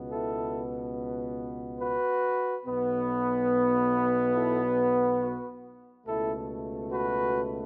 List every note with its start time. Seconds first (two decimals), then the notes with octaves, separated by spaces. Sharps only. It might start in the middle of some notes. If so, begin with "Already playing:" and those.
Already playing: C#2 B2 B3
0.10 E4 A4
1.80 F#4 B4
2.66 B1 B2 B3
4.35 E4 A4
5.21 F#4 B4
6.06 C#2 B2 A3 E4 A4
6.91 F#4 B4